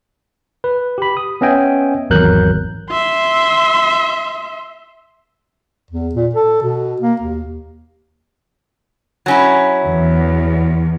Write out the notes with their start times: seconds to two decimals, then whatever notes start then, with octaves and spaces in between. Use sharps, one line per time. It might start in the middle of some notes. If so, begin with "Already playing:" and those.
0.64 B4
0.98 G4 B5
1.17 D#6
1.41 B3 C#4 D#5 E5 G5 G#5
2.10 G#1 E2 F#3 A#4 F#6 G6
2.90 E5 C6
5.91 E2
6.15 A#2
6.35 A4
6.62 B2
7.01 A#3
7.21 D#2
9.26 F#3 C#4 E4
9.85 E2